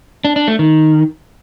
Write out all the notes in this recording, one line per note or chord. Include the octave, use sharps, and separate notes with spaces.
D4
D4
A3
D#3